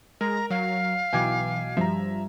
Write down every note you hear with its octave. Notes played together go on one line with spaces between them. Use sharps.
G#3 A#4 A#5
F#3 F5
B1 E3 G5 G#5 D6 G#6
G2 F3 E5 A#5